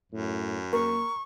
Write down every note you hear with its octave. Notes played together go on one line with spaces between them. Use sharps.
F#2 A2
A#3 A#4 C#6